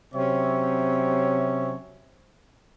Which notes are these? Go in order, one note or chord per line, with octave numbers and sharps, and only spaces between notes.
C3 F#3 C4 C#4 C#5 E5